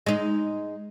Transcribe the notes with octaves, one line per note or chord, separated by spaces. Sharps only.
G#3 D#4